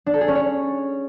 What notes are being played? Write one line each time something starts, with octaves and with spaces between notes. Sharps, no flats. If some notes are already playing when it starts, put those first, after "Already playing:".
D4
A4
G#4
C#4
C#5